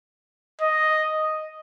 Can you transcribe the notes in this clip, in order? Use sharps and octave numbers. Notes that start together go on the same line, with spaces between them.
D#5